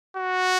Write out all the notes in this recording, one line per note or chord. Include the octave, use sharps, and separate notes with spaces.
F#4